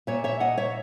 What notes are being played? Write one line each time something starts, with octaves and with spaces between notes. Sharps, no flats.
A#2 C#5 E5
C#5 E5
D#5 F#5
C#5 E5